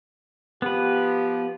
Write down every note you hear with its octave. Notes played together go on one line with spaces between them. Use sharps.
F3 B3 G4 B4